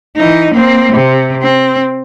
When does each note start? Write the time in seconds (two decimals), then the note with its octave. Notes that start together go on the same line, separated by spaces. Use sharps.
0.16 E3 D#4
0.54 A#3 C4
0.92 C3
1.42 C4